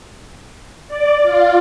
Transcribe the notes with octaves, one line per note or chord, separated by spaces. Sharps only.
D5
F4